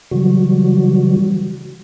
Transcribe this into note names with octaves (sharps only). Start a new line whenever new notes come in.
C#3 E3 F#3 G3 F#4